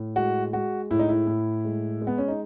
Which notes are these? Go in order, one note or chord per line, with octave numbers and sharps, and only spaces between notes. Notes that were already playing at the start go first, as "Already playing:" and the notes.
Already playing: A2
G#3 F#4
G#3 F#4
A2 E4
D#4
E4
A2
G#3
G#3
B3
C#4
D#4